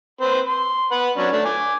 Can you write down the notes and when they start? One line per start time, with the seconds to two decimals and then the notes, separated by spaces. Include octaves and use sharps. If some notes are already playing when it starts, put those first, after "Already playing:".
0.21 C4 B4 C6
0.47 C6
0.92 B4 F#5 B5
1.17 F#3 C#4 D4
1.33 A3 D4
1.45 G#5 D6